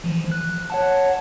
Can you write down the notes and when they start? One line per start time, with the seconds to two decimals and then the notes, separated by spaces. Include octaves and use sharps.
0.04 E3 F3
0.32 F#6
0.70 C#5 F#5 A5